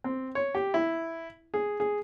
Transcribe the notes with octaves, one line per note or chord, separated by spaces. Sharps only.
C4
C#5
G4
E4
G#4
G#4